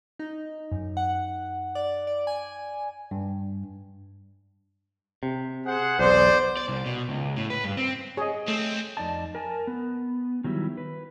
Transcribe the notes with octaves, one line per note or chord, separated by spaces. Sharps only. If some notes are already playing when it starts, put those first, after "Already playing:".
D#4
F#2
F#5
D5
D5
G#5
G2
C3
G#4 C5 F#5
B1 E2 C5 D5
D5
C2
B2
C#2
A2
B4
G2
C4
G#4 C#5 D#5
C2 A3 C4
F2 D#4 D5 D#5 A5
A#4 G#5 A5
B3
D#3 F#3 G3 D#4 E4
B4